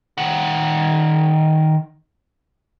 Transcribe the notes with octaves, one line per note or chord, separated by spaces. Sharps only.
D#3 F#5